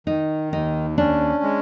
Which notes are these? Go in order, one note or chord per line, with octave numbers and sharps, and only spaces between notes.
D#3 D#4
D#2 D#4
C#4 D4
G#3